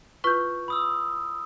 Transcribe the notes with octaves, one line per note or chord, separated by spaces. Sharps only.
E4 F4 B4 C#6 G6
B5 D#6 E6